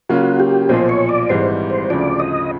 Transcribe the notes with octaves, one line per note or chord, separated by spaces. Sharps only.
C#3 F#3 A#3 C#4 F4 F#4
G4
B1 A#2 F3 C5
C#5
D5
G#1 G#2 E3 G3 C5
C5
D2 C#3 F3 D5
D#5